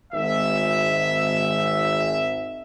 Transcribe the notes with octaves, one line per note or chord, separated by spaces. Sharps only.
G#1 E5